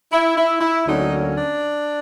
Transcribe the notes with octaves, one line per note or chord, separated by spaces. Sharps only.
E4
E4
E4
D2 D3 F#3 A#3 C#4 D#4
D4